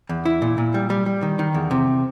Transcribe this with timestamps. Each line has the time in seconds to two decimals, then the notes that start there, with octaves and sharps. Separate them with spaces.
0.09 E2
0.25 E4
0.42 A#2
0.58 A#2
0.74 G3
0.90 G3
1.06 G3
1.22 D#3
1.39 D#3
1.54 E2
1.71 C3